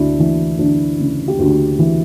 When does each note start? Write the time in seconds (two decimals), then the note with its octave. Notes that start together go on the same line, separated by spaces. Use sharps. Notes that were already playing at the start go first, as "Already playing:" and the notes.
Already playing: D2 D4 E4 F#4
0.20 E3
0.59 D2 D4
0.99 C#3
1.28 G4
1.39 D2 D4 F#4
1.79 E3